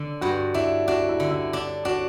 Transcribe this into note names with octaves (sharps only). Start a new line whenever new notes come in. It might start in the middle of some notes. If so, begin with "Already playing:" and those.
Already playing: D3 D4
G2 F#4
D4 E4
D4 F#4
E4
D3
E4
D4
D4 F#4